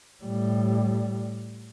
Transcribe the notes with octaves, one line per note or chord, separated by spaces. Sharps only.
A2 G3